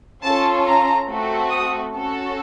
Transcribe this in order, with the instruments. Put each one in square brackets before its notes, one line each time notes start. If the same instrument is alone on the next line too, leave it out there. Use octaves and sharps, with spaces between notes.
[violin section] C#4 F4 A4 A5
A#5
A3 C4 F#4 A4
D#6
C#4 F#4 A4